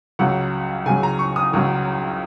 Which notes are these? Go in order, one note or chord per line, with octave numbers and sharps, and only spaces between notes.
C#2 C#3 F#3 F#5
C#2 C#3 F#3 G#5
A#5
C#6
D#6
C#2 C#3 F#3